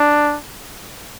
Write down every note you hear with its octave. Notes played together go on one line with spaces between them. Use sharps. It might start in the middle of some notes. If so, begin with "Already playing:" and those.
Already playing: D4